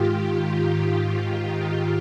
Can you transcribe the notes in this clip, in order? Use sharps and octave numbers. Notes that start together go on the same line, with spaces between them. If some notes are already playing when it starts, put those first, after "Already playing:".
Already playing: G#2 D#3 F4 G4
F4
G4